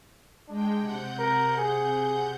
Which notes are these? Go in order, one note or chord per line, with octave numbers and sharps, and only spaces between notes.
G#3 D4 G5
C3 F#5 G6
A#4
G#4